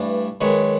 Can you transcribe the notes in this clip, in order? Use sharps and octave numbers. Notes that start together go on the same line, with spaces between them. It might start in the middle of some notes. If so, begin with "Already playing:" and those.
Already playing: G2 E3 A3 D4
F#2 D#3 G#3 B4 C#5